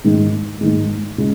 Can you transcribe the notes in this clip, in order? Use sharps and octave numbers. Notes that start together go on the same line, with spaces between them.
G#2 D#3 G#3
G#2 D#3 G#3
C#3 G#3